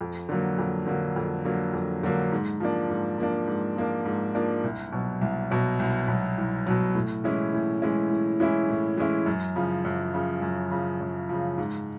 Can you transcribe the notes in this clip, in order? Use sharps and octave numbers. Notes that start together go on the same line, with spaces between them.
F2
D3 F#3 A#3
F2
D3 F#3 A#3
F2
D3 F#3 A#3
F2
D3 F#3 A#3
G#2
F3 A#3 D4
G#2
F3 A#3 D4
G#2
F3 A#3 D4
G#2
F3 A#3 D4
C2
B2 F#3
C2
B2 F#3
C2
B2 F#3
C2
B2 F#3
A2
E3 G#3 C#4 E4
A2
E3 G#3 C#4 E4
A2
E3 G#3 C#4 E4
A2
E3 G#3 C#4 E4
F#2
C#3 F3
F#2
C#3 F3
F#2
C#3 F3
F#2
C#3 F3
G#2